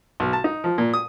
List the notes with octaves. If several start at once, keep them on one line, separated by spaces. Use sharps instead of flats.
B1
A5
D#4
F3
A#2
D#6